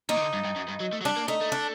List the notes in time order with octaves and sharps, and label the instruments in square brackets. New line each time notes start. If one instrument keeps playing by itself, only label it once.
[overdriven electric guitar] A#2 [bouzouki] D#4
[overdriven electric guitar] D#3
D3
G2
G2
F#2
G2
F#3
A3
F#3
[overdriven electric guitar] G3 [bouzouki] D4
[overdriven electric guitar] A#3
[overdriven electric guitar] A3 [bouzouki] D#4
[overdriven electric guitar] A3
[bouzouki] D4